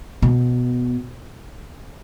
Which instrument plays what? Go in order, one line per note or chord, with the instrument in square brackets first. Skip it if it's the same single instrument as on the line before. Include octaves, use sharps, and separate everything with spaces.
[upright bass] B2